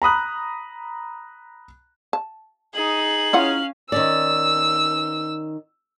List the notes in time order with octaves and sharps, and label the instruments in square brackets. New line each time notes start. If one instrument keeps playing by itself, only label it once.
[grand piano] A#5 B5 D#6 F#6
[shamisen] A5
[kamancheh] D#4 G#4 [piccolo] F#7
[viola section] C#4 F5 [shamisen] E4 F4 F#5
[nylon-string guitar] D#3 C#4 D5 [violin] E6